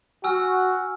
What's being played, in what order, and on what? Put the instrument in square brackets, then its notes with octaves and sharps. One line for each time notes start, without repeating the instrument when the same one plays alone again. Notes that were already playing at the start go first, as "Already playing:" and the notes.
[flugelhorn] F#4 [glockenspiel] G#5 E6 F6